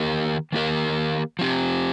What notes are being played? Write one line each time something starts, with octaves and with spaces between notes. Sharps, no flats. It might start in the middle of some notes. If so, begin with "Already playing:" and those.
Already playing: D#3 A#3 G4 A#4
D#3 A#3 G4 A#4
F3 C4 G4